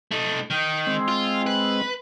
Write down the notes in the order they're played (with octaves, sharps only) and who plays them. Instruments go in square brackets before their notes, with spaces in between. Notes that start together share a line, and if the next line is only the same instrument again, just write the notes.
[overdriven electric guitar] A3 D#4
D#3 D#4
[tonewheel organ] G#3 C4
[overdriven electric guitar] F4
B4